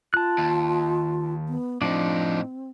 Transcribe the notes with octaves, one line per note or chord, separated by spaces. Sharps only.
F4 A5 F#6
D#2
B3
A2 F3 C4 D4 D#4